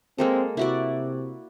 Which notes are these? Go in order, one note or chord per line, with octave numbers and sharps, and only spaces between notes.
G#3 A#3 C4 A4
C3 E4 F#4 D5